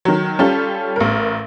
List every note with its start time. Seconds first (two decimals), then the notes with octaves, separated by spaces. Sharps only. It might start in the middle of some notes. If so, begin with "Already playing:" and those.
0.05 D#3 F#3
0.39 G3 C#4 F4 G4 A4
0.96 A1 A#4